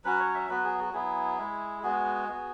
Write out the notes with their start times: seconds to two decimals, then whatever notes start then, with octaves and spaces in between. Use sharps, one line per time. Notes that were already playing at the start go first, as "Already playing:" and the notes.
0.05 F#3 C#4 F#4 B4
0.20 C#5
0.34 E5
0.49 F#3 B3 F#4 B4
0.64 G#4
0.79 F#4
0.93 F#3 B3 E4 G#4
1.38 G#3 E4
1.83 G#3 B3 F#4 G#4
2.28 B3 F#4